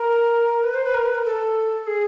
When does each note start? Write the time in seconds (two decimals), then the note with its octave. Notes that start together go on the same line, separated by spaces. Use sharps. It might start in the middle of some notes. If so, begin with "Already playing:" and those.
Already playing: A#4
0.63 B4
0.74 C5
0.84 B4
0.94 A#4
1.05 B4
1.15 A#4
1.24 A4
1.86 G#4